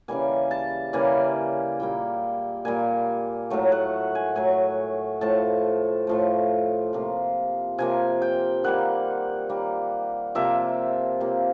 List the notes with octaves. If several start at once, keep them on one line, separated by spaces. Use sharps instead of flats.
C#3 E3 G3 A#3 G#5
A5
C#3 E3 G3 A#3 G#5
A#2 G3 A#3 G5
A#2 G3 A#3 G#5
A2 F#3 A3
F#5
G#5
A2 F#3 A3 G#5
A2 F3 A3 A5
A2 F3 A3
C3 F3 A#3
C3 F3 A#3 G#5
G5
D#3 G3 A#3 F#5
D#3 G3 A#3
C3 F3 A#3 E5
C3 F3 A#3